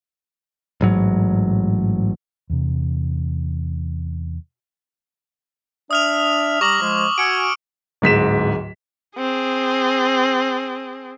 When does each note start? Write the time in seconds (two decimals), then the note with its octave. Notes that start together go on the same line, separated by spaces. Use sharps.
0.81 A1 G#2 F#3
2.50 E2 C3
5.91 D4 E5 D#6 F6 F7
6.61 G3 A#5 C#6 D6 F#7
6.81 F3 G#3
7.18 F#4 G#5 E6 C#7 D7
8.02 D1 G#2 B6 E7
9.18 C4 G#4